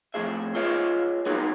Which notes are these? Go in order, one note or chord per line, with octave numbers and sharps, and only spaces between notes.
F2 A2 G#4 E5
F4 G#4 C#5 E5
G3 B3 D#4 F#4 G#4